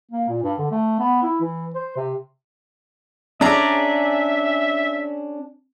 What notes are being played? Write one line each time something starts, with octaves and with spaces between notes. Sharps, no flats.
A#3
A#2
G2
D3
A3
B3
E4
E3
C5
C3
C#4 D4 G#4 D5 E5 A#5